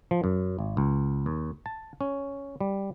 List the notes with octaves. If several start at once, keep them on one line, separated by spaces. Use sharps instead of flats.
F3
F#2
G#1
C#2
D#2
A5
C#4
G3